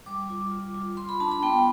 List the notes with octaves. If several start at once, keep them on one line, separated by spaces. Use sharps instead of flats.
G3 D6
F4
F4
F4
F4 C6
B5
D4 A5
B5
B3 G5